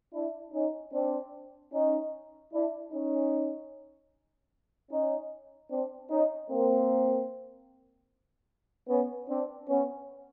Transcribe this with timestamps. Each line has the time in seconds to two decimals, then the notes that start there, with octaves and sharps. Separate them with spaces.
0.14 D4 E4
0.53 C#4 D#4
0.93 C4 D4
1.73 C#4 D#4
2.53 D4 E4
2.93 C#4 D#4
4.91 C#4 D#4
5.71 C4 D4
6.10 C#4 D#4
6.50 A#3 C4
8.89 B3 C#4
9.29 C4 D4
9.69 B3 C#4